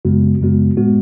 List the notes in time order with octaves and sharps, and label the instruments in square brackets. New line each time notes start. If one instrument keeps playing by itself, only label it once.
[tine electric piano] F#2 C#3 G#3 B3 F#4
F#2 C#3 G#3 B3 F#4
A2 G#3 B3 F#4